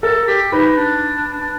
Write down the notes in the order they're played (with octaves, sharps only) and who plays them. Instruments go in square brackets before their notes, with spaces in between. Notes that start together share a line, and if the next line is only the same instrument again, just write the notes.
[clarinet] A4 [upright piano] A#4
[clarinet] G4
[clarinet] D#4 [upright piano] B4
[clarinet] D4
D4